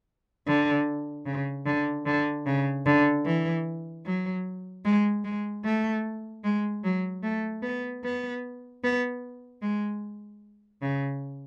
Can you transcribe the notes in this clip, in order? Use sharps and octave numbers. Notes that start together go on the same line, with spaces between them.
D3
C#3
D3
D3
C#3
D3
E3
F#3
G#3
G#3
A3
G#3
F#3
A3
B3
B3
B3
G#3
C#3